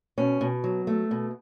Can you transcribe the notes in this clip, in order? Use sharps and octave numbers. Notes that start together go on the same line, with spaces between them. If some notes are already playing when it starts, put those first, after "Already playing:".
B2 C#4
B2
F#3
A3
B2